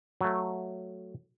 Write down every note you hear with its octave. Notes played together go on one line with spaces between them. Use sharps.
F#3 A3